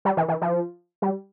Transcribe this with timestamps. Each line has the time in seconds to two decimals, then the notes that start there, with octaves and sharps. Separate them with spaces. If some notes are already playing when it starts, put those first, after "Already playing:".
0.05 G3
0.17 E3
0.28 E3
0.42 F3
1.02 G3